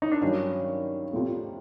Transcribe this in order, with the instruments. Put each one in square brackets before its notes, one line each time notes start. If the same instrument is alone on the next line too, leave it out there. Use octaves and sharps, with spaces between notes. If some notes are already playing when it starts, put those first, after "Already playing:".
[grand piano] D#4
D4
[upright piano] G2 D#3 F#3 [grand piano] C#4
[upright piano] F2 C3 F3 A3